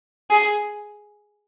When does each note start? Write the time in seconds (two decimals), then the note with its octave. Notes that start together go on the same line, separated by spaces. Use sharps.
0.31 G#4